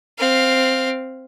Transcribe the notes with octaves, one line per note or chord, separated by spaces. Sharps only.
C4 F5